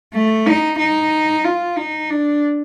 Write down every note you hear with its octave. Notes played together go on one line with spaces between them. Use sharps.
A3
D#4
D#4
F4
D#4
D4